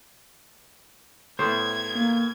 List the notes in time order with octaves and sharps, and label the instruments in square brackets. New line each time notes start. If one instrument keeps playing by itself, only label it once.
[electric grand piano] A2 B3 [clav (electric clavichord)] C5 [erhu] G#6
[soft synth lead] A#3